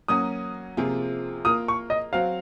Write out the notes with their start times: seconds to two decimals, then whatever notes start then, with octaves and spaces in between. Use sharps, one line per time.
0.08 F#3 A#3 C#4 F#4 D#6
0.77 C3 F3 A#3 F4 G#4
1.45 A#3 F4 A#4 D#6
1.68 C#6
1.90 D#5
2.13 F#3 C4 F#4 F5